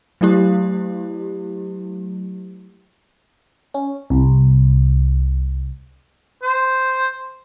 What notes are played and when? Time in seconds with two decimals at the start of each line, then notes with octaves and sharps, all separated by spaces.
0.21 F#3 A3 E4 G4
3.74 C#4
4.10 C2
6.43 C5